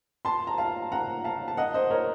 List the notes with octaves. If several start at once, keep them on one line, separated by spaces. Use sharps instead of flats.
A5 C6
A#5
F5 A5
F#5 A#5
F5 A5
A5
D#5 F#5
C5 D#5
A#4 C#5